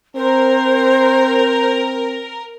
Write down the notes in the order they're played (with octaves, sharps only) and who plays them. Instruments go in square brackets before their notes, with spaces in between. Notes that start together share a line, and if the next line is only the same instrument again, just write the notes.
[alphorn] C4 [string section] A#4 [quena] C5